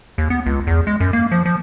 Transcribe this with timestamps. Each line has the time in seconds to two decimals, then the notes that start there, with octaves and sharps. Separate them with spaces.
0.18 D#2
0.30 B3
0.46 C#2
0.67 E2
0.87 G#3
1.00 F#2
1.13 A#3
1.32 F3
1.45 F3